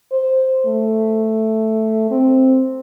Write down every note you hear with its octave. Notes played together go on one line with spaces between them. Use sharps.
C5
A3
C4